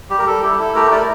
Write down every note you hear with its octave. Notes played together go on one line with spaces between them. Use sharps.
G3 G4
A#4
G3 A4
E4 G4
E4 A4
A3 G4 A#4
E4 A#4 D5